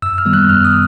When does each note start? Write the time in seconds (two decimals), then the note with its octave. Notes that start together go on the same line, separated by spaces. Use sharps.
0.02 F#2 E6
0.18 F6
0.25 D#3 G3 B3
0.33 F#6
0.49 F#2 F6
0.65 D#6